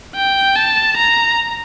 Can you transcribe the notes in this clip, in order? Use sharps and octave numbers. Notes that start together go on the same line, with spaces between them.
G5
A5
A#5